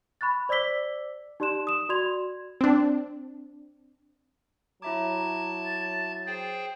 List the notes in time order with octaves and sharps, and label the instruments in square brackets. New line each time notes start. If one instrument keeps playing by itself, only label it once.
[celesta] B5 C#6 F#6 A6
C5 D5 D6 E6 B6 G7
D#4 G4 D5 C6 F#6 E7
D#6 E7
F#4 D5 C6 G#6 F7
[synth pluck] C4 D4
[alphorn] F#3 [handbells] E4 E5 D6 [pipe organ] A5 G#6 [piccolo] A#5
[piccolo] A6
[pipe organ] G#4 C5 G5